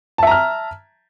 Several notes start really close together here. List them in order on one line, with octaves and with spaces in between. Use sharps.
A5 E5 A#5 F6